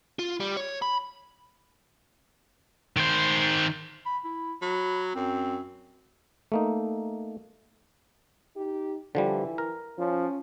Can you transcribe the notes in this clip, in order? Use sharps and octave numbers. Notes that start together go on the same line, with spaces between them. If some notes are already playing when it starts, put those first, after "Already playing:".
F4
G3
C#5
B5
D#3 C5
B5
E4
F#3 B5
F#2 C4
A3 A#3 D#4
D#4 G4
D3 E3 F3 G3
A#4
F3 C#4